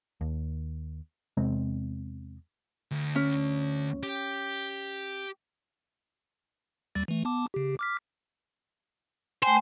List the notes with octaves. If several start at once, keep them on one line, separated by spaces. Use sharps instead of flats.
D#2
E2 C3 G#3 C4
D2
C#4
G4
D#2 G3 A6
E3 A3
B3 A5 D6
C#3 G4
D6 F6 B6
A3 C5 G5 G#5